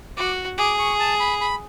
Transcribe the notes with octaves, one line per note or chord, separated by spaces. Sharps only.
F#4 D6
G#4 D6
C#6
A5
B5
B5